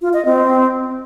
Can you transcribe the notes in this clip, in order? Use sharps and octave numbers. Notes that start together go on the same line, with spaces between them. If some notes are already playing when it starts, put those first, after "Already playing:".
F4
D#5
C4